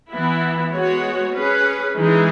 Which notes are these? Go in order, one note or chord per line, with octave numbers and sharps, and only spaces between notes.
E3 B3 E4
G#3 B3 F#4 C#5
C#4 G#4 B4
E3 G#3 D#4 G#4